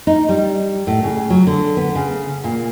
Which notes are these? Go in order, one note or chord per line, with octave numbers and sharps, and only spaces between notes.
D#4
G3
A2
C#3
F#3
D3
B3
C#3
A#2